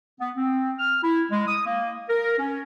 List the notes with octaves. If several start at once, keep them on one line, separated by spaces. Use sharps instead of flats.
B3
C4
F6
E4
G#3
D#6
A#3
A#4
C#4